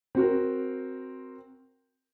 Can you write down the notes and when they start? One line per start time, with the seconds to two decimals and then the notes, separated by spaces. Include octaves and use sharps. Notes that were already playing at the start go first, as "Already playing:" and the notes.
0.15 C4 F#4 A#4